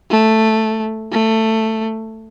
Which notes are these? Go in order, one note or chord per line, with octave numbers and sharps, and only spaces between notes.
A3
A3